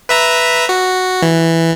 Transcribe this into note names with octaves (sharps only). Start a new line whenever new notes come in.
B4 E5 A#5
F#4
E3